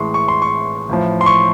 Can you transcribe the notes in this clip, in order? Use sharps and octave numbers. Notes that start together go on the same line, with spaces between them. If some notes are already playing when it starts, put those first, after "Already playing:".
Already playing: A1 A2 E3 G#3 C6 C#6
C#6
C6
C#6
A1 A2 F3
C6
C#6